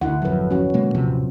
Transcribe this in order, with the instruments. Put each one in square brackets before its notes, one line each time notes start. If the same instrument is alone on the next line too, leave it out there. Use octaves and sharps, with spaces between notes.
[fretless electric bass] D2 [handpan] D3 E4 F#5
[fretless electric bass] G#1 F2 [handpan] F#3 B4
[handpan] C#4 F#4
[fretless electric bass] B2 G#3 A#3
[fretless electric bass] D#1 A1 C3 [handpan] F3